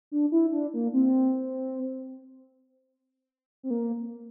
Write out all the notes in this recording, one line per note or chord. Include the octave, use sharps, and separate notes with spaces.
D4
E4
D4
A#3
C4
C4
A#3